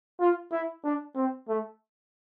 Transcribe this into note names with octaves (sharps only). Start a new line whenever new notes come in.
F4
E4
D4
C4
A3